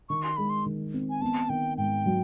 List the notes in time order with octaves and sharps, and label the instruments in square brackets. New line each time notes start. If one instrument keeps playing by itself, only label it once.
[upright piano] D#3 [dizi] C#6
[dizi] C6
[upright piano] G#3 [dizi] B5
[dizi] C6
[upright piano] D#3
C4
[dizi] G#5
[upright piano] B3 [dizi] A5
[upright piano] D#3 [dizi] G5
[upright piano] G#2 [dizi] G5
[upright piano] F#3